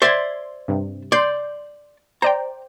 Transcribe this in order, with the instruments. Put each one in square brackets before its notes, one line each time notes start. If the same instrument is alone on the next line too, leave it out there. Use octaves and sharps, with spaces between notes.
[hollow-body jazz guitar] C5 D5 E5 [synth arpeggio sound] C6 G#6
[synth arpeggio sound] G2 C3
[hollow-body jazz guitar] D5 [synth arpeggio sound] C6 G6
[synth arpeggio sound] C5 D5 G5 [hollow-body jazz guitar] A#5